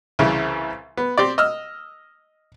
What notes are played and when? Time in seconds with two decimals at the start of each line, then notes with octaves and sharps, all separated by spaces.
0.19 C2 C#3 E3
0.97 B3
1.18 C4 G4 D5
1.38 D#5 E6 F6